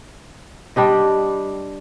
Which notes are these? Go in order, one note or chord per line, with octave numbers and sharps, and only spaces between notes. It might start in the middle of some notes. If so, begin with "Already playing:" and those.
G3 D4 G4 D#5